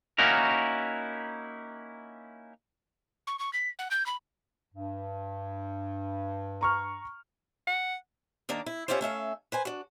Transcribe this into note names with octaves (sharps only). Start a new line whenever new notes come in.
A#3 C#4 D#4 E4 F#4 A#4
C#6
C#6
B6
F#5
G6
B5
G2
A#5 C#6 F6
F#5
D#3 A#3 D4 A#4
E4
C#4 D4 E4 F4 G4 C5
A3 C#4 E5 F5
B4 C5 G#5
D4 F#4